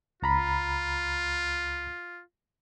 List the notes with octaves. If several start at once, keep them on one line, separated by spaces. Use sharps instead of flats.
C#2 F4 A#5 B5